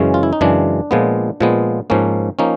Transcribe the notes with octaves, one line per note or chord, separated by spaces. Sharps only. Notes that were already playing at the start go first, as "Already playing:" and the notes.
Already playing: F#2 C#3 E3 G#3 C#4
F4
E4
D#4
F#2 C#3 E3 G#3 D4
A#2 F3 G#3 B3
A#2 F3 G#3 B3
G#2 F3 A#3 C#4
F3 A#3 C#4 D#4